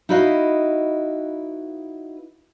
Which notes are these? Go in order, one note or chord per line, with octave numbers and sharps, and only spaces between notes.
D#4 E4 F#4 B4 D#5 F5